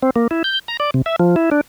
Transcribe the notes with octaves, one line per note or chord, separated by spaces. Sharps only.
C4
A#3
E4
G6
A#5
D5
C3
E5
F3
E4
D4